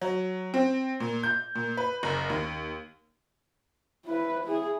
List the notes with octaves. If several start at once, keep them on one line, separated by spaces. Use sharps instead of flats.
F#3
C4
A#2
G6
A#2
B4
F#1
D#2
E4 B4
E4 G#4